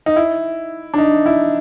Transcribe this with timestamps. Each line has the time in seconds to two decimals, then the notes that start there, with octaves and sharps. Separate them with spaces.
0.06 D#4
0.16 E4
0.94 D4
0.98 D#4
1.26 E4